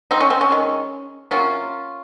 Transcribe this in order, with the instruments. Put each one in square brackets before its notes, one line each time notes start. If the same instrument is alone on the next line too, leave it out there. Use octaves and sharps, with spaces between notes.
[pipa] C4 D#4
C#4
C4
C#4
D#3 G#3
C3 F#3 A#3 C#4 F4